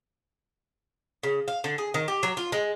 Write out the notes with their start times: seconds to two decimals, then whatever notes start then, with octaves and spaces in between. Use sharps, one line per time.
1.23 C#3
1.48 F5
1.64 D3
1.78 G#4
1.94 D#3
2.08 G4
2.23 F#3
2.37 F4
2.52 G#3